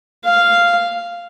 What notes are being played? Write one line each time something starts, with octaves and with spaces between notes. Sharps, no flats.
F5